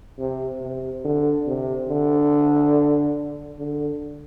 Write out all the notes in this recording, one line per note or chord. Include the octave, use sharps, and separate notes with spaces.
C3
C3
D3
C3
D3
D3